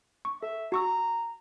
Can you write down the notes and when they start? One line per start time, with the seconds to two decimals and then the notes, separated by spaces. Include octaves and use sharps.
0.25 C#6
0.43 A4 E5
0.72 F#4 A#5 C#6 E6